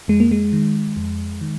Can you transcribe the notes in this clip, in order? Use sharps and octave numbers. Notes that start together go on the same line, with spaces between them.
F2 G#3
A#3
G#3
D#3
F2
D#3